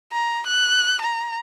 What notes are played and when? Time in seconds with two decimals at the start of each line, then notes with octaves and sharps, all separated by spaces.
0.12 A#5
0.47 F#6
1.01 A#5